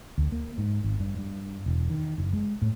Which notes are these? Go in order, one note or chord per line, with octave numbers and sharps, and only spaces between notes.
D2
A#3
G#2
G#1
G2
G2
E1
D#3
F#1
G#3
A2